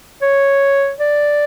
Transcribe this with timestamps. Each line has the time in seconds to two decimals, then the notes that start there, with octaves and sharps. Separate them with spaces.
0.22 C#5
0.99 D5